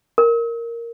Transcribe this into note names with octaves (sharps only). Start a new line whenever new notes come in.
A#4